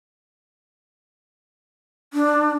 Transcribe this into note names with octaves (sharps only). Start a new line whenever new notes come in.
D4